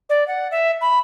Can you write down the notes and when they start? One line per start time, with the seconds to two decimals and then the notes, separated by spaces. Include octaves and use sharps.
0.09 D5
0.27 F#5
0.51 E5
0.81 B5